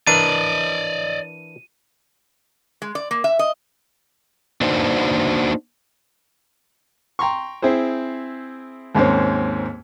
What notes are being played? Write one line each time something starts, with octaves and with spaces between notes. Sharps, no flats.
E3 D4 A#4 D5 D#5 D#7
G#3
D5
A#3
E5
D#5
A#3 D4 D#4 F#4 B4 C5
G5 A#5 C6 C#6
C4 E4 G#4 C5
D#2 G#2 A#3 C4 C#4